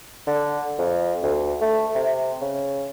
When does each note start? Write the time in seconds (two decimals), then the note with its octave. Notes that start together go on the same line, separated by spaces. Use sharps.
0.27 D3
0.78 F2
1.22 D2
1.61 A3
1.95 C3
2.41 C#3